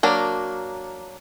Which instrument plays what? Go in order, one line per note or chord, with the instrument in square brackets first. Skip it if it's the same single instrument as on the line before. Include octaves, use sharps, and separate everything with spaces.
[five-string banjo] F#3 A#3 D4 A#4